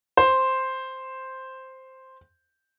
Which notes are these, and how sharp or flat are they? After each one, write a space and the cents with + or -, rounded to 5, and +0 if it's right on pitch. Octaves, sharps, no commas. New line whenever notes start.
C5 +0